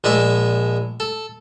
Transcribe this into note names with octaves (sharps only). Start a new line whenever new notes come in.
A#1 G#3 D5 E5 A5
A4